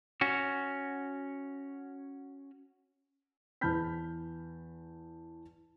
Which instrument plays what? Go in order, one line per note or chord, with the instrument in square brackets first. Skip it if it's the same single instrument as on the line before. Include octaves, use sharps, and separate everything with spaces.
[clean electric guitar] C#4 F#4
[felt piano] E2 A5 B5 F6 G6 B6